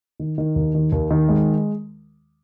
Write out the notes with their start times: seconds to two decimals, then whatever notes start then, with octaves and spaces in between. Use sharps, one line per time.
0.20 D#3
0.38 D#3
0.56 D#2
0.75 D#3
0.92 D#2
1.11 D#3
1.28 G#3